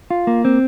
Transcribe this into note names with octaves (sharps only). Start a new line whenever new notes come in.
F4
A#3
C4